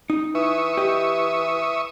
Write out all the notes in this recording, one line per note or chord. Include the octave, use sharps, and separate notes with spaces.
D#4
E3 E5 C#6 D#6
G4 D#5